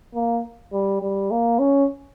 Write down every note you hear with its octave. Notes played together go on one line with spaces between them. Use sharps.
A#3
G3
G3
A#3
C#4